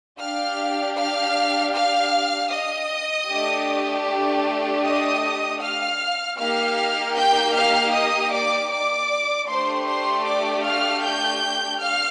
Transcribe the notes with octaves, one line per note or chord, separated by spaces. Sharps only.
D4 G4 F5 F6
F5 F6
F5 F6
D#5 D#6
A3 D4 G4
D#5 D#6
F5 F6
A#3 D#4 G4 F5 F6
G5 G6
F5 F6
D#5 D#6
D5 D6
D5 D6
A3 D4 G4 C5 C6
C5 C6
D5 D6
F5 F6
G5 G6
F5 F6